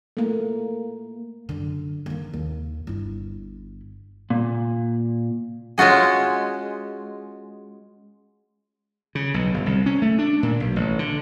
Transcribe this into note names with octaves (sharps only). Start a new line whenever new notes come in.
A3 A#3
F#2 D3
D#3 A#3
D#2
G1 E4
A#2
G#3 C#4 F4 F#4 G#4
C#3
B1
G1
C2
C#4
A3
D4
A#2
B1
A1
D3